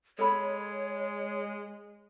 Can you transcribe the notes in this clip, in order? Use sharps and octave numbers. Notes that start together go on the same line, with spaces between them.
G#3 A4 C#5 B5